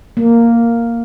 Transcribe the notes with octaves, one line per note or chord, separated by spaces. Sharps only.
A#3